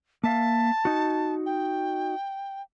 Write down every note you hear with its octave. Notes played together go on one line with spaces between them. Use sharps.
A#3 E5 F5 A5
D#4 F#4
G5